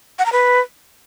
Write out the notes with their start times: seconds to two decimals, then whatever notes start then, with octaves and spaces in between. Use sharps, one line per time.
0.19 F#5
0.26 A#5
0.32 B4